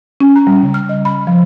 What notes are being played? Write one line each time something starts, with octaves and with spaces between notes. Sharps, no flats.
C#4
A#5
G3
C#3
F6
D#5
B5
F3